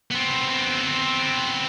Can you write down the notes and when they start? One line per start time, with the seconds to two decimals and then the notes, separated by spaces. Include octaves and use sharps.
0.11 B3 C4